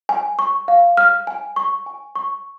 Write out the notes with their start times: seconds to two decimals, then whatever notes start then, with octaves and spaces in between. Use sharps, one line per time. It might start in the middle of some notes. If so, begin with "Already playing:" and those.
0.09 G#5
0.39 C#6
0.68 F5
0.97 F6
1.27 G#5
1.56 C#6
1.86 G#5
2.15 C#6